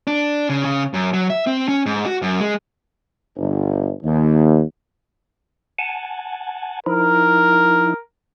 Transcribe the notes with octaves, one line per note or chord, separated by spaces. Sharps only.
D4
C#3
C#3
F#2
F#3
E5
C4
C#4
G#2
F#4
F#2
G#3
G1
D#2
F#5 G#5 A5
F3 D#4 E4 A#4